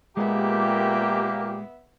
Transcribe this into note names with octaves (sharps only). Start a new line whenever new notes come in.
A#2 G#3 A#3 B3 G4 E5